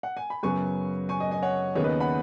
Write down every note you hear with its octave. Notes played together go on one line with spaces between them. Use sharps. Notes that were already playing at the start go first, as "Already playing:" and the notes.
F#5
G#5
B5
F#2 C#3 F#3 B3 G#5 C#6
G#5 C#6
D#5 G#5
D#5 G#5
C#5 F#5
D#2 C#3 B3 C#5
B4 D#5
F#5 B5